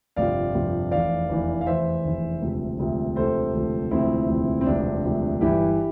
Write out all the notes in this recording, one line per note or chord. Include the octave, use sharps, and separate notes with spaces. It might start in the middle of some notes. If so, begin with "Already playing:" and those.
G1 F2 C3 F3 D5 F5
G1 F2 C3 F3
F1 E2 E3 D5 F5
F1 E2 E3
F5
F1 E2 E3 C5 E5
F1 E2 E3
E1 D2 C3 F3
E1 D2 C3 F3
E1 D2 C3 F3 A4 C5
E1 D2 C3 F3
E1 D2 C3 F3 C4 E4
E1 D2 C3 F3
C4
E1 D2 C3 F3 D4
E1 D2 C3 F3
G1 G2 E3 E4 G4